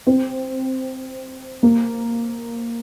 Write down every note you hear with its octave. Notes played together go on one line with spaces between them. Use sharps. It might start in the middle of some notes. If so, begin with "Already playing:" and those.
C4
A#3